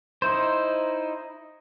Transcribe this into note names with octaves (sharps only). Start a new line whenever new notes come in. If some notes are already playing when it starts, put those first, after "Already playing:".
D#4 E4 C5